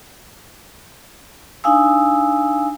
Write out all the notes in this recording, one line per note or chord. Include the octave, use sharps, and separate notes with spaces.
D4 D#4 F5 G#5 E6